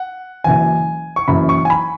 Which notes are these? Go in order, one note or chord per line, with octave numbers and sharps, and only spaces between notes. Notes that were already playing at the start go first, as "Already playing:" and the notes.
Already playing: F#5
F#1 F#2 E3 G#5
C#6
F#1 F#2 E3 B5
C#6
G#5
B5